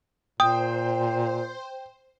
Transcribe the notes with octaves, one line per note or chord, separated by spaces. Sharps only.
A#2 C5 G5 D#6